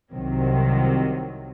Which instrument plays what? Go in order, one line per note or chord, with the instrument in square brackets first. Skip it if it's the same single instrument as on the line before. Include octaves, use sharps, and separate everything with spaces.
[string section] C2 C3 D#3 F#3